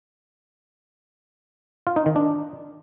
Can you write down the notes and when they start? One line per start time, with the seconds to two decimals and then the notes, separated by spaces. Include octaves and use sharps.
1.87 F4
1.96 D#4
2.06 D#3
2.16 D4